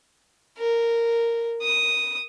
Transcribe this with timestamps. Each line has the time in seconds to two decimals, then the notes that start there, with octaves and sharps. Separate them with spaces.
0.58 A#4
1.62 D#6